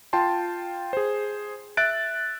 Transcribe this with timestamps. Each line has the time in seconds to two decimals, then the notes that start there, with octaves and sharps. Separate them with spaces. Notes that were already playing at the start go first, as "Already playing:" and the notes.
0.13 F4 G5 A5 C6
0.93 G#4 C5
1.77 E5 F#6 A6 D7